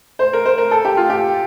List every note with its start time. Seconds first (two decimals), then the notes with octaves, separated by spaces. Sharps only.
0.19 C5
0.33 A#4
0.45 C5
0.58 A#4
0.71 A4
0.85 G4
0.97 F4
1.10 G4